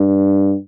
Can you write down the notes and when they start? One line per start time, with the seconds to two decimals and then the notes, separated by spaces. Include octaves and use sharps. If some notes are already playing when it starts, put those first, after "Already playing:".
Already playing: G2